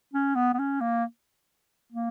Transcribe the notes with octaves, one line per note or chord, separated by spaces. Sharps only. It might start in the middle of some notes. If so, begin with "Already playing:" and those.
C#4
B3
B3
C#4
A#3
A#3